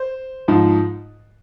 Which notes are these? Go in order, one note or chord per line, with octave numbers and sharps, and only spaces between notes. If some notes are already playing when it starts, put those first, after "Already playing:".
Already playing: C5
G#2 F3